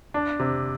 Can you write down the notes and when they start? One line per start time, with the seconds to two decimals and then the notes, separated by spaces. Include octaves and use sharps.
0.14 D4
0.39 C3